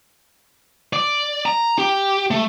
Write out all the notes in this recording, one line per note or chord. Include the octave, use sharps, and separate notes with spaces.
D5
A#5
G4
A3